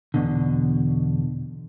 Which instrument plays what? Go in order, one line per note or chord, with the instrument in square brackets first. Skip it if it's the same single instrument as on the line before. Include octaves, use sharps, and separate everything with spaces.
[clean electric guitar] E2 B2 D3